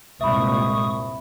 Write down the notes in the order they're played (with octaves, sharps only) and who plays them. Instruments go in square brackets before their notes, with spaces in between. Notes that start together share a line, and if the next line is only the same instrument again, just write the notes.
[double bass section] C2 G2 A#2 [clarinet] G#3 [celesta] E5 B5 [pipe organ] C#6 D#6